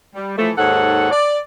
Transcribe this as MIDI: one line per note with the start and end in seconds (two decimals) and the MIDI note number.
0.15 0.33 55
0.37 0.50 52
0.37 0.50 53
0.37 0.50 57
0.57 1.11 39
0.57 1.11 44
0.57 1.11 69
0.57 1.11 73
0.57 1.11 78
1.12 1.38 74